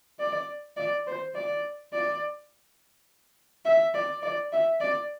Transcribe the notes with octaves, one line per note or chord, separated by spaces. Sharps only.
D5
D5
C5
D5
D5
E5
D5
D5
E5
D5